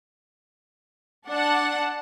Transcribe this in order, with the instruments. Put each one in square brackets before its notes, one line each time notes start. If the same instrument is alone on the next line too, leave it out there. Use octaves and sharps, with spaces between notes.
[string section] D4 F#5 A5